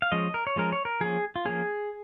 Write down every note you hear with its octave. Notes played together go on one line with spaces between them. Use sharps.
F5
F3 G#3 C#4 D#5
A#4
C#5
F3 G#3 C#4 A#4
C#5
A#4
F3 A#3 C#4 G#4
F4
F3 A#3 C#4 G#4